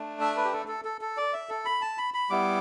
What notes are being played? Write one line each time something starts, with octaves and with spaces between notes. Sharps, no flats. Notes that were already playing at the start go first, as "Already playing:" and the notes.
Already playing: A3 D4
E5
B4
G4
A4
A4
A4
A4
D5
E5
A4
B5
A5
B5
B5
G3 B3 E4 D6